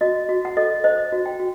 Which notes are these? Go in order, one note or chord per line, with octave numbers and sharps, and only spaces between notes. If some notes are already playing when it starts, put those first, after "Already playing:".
F#4 D#5
F#4
F#5
A4 D#5
C5 D#5
F#4
G5
F#4